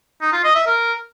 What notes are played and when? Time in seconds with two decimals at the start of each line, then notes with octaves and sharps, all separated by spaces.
0.22 D#4
0.33 F4
0.44 D#5
0.55 E5
0.67 A#4